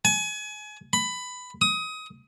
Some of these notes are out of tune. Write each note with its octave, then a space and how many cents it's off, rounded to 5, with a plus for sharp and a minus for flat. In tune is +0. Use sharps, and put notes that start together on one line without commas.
G#5 +30
B5 +15
D#6 +25